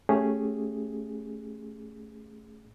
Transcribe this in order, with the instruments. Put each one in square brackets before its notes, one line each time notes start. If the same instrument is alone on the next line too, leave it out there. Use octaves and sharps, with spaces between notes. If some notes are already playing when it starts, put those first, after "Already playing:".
[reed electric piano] A3 C#4 G4 G#4